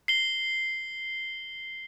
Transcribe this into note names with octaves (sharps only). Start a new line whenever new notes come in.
C7 G7